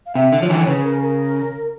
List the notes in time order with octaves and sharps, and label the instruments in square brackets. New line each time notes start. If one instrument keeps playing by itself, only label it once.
[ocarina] F5
[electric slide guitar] C3 [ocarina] E5
[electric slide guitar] D3
[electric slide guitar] F3 [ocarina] C#5
[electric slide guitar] D3 E3
[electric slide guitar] C#3 [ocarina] B4
[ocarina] A#4
A#4